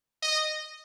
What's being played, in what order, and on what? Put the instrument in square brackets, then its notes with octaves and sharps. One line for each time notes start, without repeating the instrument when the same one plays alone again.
[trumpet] D#5